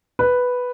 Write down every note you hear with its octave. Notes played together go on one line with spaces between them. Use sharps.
B4